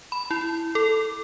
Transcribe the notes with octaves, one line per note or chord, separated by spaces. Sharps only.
B5
E4
A4